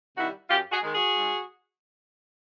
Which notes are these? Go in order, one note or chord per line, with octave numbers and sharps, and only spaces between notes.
C3 D#3 G3 E4 F#4
F#2 F4 G4
F#4 G#4
D#3 G#3
F#4 G#4
G#2